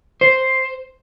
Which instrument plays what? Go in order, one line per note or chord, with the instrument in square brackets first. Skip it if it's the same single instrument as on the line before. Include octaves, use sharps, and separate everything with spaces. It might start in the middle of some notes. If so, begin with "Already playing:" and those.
[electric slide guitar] C5